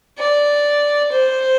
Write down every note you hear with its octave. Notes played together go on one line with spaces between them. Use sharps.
D5
C5